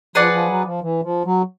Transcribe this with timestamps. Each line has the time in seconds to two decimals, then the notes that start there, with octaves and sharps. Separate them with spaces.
0.15 F3 G#4 B4 D5 F#5
0.33 F3
0.48 F#3
0.65 F3
0.81 E3
1.03 F3
1.25 F#3